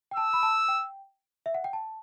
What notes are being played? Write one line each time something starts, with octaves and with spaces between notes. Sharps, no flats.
G5
A5 E6
B5
A5
G5
E5
F#5
G5
A5